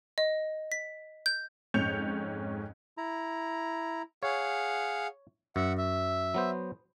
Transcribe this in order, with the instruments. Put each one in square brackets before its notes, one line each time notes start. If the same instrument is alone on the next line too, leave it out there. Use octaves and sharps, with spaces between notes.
[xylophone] D#5
B6
G6
[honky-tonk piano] F2 G#2 C#4 G6 C#7 F7
[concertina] E4 A#5
[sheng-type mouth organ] G#4 F5 F#5 [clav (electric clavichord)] C#5
[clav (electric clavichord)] F#2 [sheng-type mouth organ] E5 F#5
[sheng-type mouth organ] E5
[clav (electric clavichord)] F#3 B3 C5